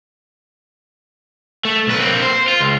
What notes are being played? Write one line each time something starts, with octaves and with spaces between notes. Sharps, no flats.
A3
B1 B4
A#3 C4
C5
F4
C#2